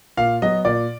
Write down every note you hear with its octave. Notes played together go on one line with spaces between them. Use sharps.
A#2 F5
F#3 B3 D#5
A#2 D5